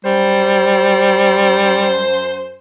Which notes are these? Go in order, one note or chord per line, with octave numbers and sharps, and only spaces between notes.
F#2 G3 C5